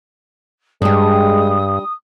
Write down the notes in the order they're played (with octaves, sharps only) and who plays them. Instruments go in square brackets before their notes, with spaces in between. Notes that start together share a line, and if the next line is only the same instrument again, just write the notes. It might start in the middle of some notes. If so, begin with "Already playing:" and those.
[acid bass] G2 [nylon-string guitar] G3 D4 [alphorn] G#3 [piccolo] D#6